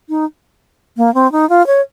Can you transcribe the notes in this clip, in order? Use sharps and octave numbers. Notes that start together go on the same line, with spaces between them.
D#4
A#3
C4
D#4
F4
C#5